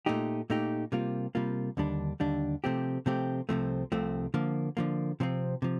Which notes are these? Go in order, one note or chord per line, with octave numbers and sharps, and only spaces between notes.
A#2 A3 D#4 G4
A#2 A3 D#4 G4
C3 G3 A#3 F4
C3 G3 A#3 F4
D#2 D3 G3 D4
D#2 D3 G3 D4
C3 F3 A3 C4 G4
C3 F3 A3 C4 G4
C2 C3 F3 A3 C4
C2 C3 F3 A3 C4
D3 F3 A#3
D3 F3 A#3
C3 F3 C4
C3 F3